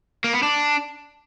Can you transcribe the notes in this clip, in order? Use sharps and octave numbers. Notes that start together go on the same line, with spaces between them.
A#3
B3
D4